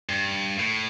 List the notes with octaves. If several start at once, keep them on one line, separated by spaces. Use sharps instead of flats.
G2
A2